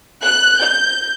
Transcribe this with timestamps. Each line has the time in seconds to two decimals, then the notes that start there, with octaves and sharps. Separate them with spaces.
0.24 F#6
0.63 G6